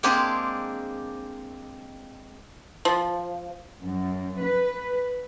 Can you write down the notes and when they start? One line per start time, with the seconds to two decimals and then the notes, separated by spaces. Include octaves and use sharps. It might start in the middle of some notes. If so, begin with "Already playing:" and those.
0.03 G#3 A#3 C4 D4 G4 G#4
2.85 F3
3.84 F#2
4.44 B4